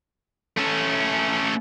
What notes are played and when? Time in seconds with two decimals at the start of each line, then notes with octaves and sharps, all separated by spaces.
0.57 A3 C#4